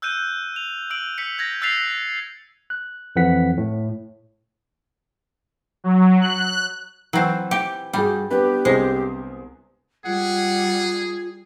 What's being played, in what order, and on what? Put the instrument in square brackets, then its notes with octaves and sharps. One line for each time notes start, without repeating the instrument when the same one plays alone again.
[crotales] E6 F#6 G6 D#7
F7
E6 D7 F#7
E6 F#6 B6 C#7
G6 G#6 A#6
E6 F#6 A6 B6 C7 F7
[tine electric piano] F#6
F2 E3 F#5 B6
A2
[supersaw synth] F#3
F#6
[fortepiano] E3 [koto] F#3 C4
[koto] G4
[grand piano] G2 F#4 G#4 [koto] G3
[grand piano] B3 D4 [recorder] G4 [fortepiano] B4
[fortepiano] C2 G#4 C5 [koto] G#3
[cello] G3 [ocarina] F4 [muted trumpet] G#4 [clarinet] F#5